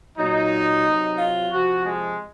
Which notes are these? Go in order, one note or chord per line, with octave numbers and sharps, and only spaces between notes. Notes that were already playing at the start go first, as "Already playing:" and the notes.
A#2 F#3 D#4
C3 F#3
F4
C3 F3 F#4
G#3